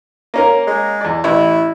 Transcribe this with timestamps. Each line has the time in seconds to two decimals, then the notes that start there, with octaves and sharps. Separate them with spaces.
0.34 A#3 C#4 A#4
0.67 G#3
1.01 E2 D5
1.24 A1 E4